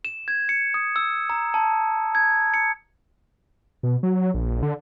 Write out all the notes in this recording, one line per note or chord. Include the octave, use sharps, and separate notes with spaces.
E7
G#6
C#7
D#6
E6
A#5
A5
G#6
C#7
B2
F#3
A#1
D3